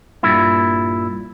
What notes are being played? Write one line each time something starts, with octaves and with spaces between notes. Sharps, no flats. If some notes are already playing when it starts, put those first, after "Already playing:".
G2 A#2 E4